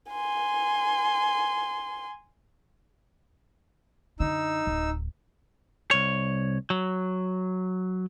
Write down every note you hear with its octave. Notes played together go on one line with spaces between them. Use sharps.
G#5 C6
F#2 D3 D#4 E6
D1
C2 C#5
F#3